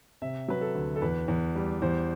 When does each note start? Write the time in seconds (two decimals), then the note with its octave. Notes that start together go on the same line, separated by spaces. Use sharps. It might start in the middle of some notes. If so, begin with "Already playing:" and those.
0.22 C3 E5
0.48 F#3 B4
0.61 A4
0.75 D2
0.96 A4
1.02 E2 B4
1.28 E2
1.55 G3
1.82 E2 C5